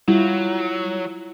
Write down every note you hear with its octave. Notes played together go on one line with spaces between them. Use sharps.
F#3 G3 E4 F4